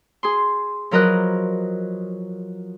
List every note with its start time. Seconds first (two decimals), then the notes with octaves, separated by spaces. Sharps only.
0.23 G#4 C6
0.91 F3 F#3 A#4 B4 D#5 F#6